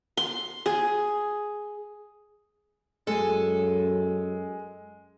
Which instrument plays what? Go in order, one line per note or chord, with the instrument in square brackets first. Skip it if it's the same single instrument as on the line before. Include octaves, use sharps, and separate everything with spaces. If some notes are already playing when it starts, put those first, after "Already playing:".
[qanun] C6
G#4
[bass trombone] F#2 [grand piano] G#3 [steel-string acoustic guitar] A4 G#5